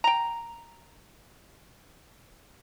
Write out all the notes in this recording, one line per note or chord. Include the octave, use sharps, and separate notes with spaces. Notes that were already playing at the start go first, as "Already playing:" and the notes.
G5 A#5